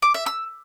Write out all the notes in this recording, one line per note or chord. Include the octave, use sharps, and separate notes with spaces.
D6
E5
E6